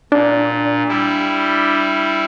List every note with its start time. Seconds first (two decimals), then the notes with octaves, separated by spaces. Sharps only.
0.12 A#2 D4
0.88 G3 E4